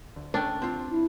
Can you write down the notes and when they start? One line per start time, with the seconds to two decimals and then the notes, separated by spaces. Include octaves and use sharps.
0.16 D2
0.34 A3 C#4 D4 G5
0.62 C4 F4
0.91 E4